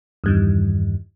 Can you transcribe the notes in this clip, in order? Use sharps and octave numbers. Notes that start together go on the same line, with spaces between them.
E2 G2 D#3